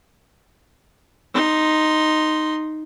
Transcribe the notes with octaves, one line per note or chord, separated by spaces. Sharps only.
D#4 C6